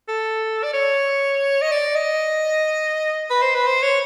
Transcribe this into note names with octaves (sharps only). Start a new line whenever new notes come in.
A4
D5
C#5
D#5
D5
D#5
B4
C5
B4
C5
C#5